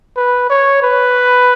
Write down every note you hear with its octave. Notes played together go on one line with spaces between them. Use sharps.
B4
C#5
B4